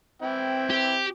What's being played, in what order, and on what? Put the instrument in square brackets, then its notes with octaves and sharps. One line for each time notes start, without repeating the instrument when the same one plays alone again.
[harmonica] E3 E4 G5 [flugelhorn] C4
[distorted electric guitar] G4